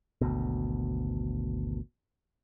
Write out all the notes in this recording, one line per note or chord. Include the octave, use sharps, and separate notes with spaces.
G#1 D2 B2